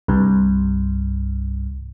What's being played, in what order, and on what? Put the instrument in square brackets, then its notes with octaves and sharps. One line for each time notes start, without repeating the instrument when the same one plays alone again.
[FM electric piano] C2 G2